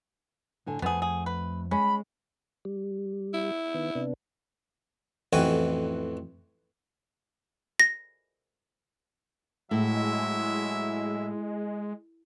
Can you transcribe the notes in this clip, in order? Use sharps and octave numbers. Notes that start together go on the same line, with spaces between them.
A2 D3 G#5
F2 F3 A3 B3 G#4 C5 F#5
G#4
B4
G#3 C#4 B5
G3
E4
D#3 B3
C3 B3 D4
A1 F2 E3 F#4 G5 G#5
A#6
A2 F#3 G#3 E4 E5